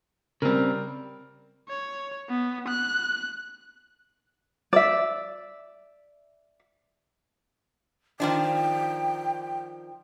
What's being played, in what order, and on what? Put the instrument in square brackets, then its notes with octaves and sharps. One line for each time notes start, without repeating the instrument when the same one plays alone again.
[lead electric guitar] C#3 C4 [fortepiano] G3 A#4
[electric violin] C#5
B3
F#6
[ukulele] D5 E5
[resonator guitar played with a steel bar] D#3 F3 D4 [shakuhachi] G5